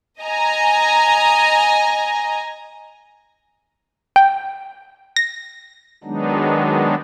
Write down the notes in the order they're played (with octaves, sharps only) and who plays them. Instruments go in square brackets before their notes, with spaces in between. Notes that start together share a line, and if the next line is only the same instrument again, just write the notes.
[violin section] D#5 G#5 A#5
[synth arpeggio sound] G5
A#6
[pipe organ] D#3 F#3 G#3 B3 D4 D#4